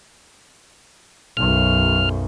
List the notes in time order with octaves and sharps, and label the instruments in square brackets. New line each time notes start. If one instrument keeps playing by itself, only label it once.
[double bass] B1 F#2 [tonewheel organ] F6